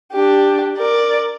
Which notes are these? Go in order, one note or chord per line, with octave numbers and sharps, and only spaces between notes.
D4 G4
A#4 D5